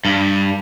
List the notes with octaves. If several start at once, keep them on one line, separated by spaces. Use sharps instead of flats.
G2